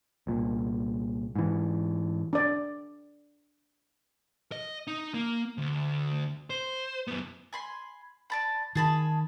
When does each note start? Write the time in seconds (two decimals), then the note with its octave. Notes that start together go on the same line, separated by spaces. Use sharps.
0.27 C2 A#2
1.36 G#2 E3
2.33 D4 D5
4.52 D#5
4.87 D#4
5.14 A#3
5.58 D2
6.50 C5
7.08 F#2 B3
7.53 G#5 B5 C6
8.30 D5 A5 B5
8.75 D#3 G#4 A5 B5